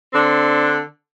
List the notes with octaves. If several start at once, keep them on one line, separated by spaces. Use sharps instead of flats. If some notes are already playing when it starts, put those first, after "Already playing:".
D3 C4 D4